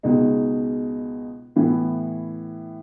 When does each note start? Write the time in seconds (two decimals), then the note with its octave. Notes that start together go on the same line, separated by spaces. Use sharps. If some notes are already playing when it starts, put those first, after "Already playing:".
0.03 C#2 B2 G#3 D#4
1.56 A2 E3 B3